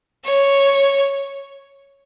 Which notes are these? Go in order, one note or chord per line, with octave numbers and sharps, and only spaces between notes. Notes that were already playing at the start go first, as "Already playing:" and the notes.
C#5